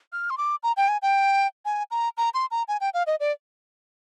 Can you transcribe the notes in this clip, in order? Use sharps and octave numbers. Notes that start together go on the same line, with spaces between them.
F6
C6
D6
A#5
G5
G#5
G5
G#5
A#5
A#5
C6
A#5
G#5
G5
F5
D#5
D5